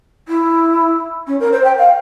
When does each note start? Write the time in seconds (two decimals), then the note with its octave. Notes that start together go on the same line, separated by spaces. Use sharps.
0.28 E4
1.27 C#4
1.40 A#4
1.52 C5
1.64 G5
1.78 F5